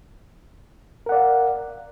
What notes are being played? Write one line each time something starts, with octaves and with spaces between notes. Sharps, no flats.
A#4 D5 F5 F#5